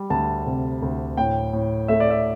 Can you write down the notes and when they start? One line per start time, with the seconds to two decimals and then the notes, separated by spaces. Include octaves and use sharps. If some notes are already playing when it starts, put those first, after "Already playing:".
Already playing: G3
0.10 D2 A5
0.46 C3
0.82 D2
1.17 A2 G5
1.53 A2
1.88 A3 E5
2.00 D5
2.11 E5